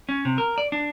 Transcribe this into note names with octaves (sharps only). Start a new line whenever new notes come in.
C#4
C3
A#4
D5
D4